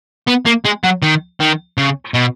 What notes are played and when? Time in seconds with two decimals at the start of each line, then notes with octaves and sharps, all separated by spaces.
0.28 B3
0.47 A#3
0.65 G#3
0.84 F#3
1.02 D#3
1.40 D#3
1.78 C#3
2.14 B2